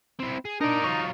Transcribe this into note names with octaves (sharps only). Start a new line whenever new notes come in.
C4 E4
G#4
D4 D#4 A#4 D5
F#3 F4 C#6